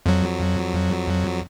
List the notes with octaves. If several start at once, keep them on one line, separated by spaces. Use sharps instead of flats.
F2 F#3